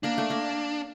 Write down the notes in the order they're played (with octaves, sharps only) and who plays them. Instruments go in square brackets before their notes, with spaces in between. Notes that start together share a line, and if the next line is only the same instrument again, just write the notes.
[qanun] A#3 [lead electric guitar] D4
[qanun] A3
A#3